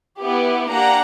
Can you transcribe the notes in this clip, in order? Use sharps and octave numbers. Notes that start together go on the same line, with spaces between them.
B3 E4 G4
A#3 D4 G4 F#5 A#5